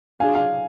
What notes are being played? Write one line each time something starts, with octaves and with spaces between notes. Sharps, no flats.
F#3 D4 F4 G#4 F5 G#5
F5